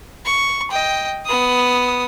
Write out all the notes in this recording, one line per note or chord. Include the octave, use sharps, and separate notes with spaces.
C#6
D#5 G5
B3 D#6